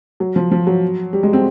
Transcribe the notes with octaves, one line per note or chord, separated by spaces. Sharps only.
F#3
F3
F3
F#3
G3
G#3
C4